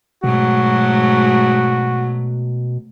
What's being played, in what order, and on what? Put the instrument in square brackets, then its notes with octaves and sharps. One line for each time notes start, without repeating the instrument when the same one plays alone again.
[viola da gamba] G#2 F#3 A3 [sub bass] B2 [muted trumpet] F#4